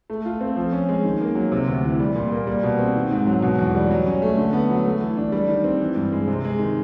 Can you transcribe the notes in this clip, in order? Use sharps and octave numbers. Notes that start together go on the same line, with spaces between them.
A3
F4
C4
F3
C#4
G#3
D#3
A#3
F#3
C3
D2
E3
G3
A#2
A#3
G3
B2
C4
D#3
G#2
F#3
B2
E2
G3
F#3
C#4
A3
D3
B3
F#3
A3
E3
D4
G3
D#3
C4
E3
G2
G#3
C3
G#3
D#3